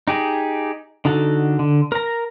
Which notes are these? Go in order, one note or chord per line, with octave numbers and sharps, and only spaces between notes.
D#4 G4 G#4
D3 D#4 F#4 A4
D3
A#4 A#5